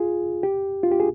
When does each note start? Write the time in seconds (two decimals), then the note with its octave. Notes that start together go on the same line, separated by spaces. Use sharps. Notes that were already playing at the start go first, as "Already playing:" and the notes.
Already playing: F4 G#4
0.43 G4
0.83 F4
0.92 G4
1.00 G#4